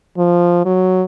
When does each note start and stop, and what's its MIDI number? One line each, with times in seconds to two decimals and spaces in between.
0.18 0.65 53
0.65 1.03 54